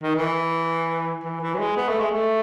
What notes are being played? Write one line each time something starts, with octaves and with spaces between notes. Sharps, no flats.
D#3
E3
E3
E3
F#3
G#3
B3
A3
G#3
A3